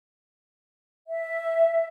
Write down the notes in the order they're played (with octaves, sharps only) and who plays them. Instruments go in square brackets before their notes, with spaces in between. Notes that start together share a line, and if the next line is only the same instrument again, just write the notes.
[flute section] E5